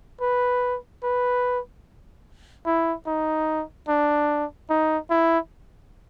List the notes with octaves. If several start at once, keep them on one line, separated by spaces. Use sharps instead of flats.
B4
B4
E4
D#4
D4
D#4
E4